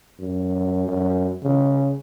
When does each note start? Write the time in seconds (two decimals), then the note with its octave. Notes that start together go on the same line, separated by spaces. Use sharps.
0.20 F#2
0.88 F#2
1.43 C#3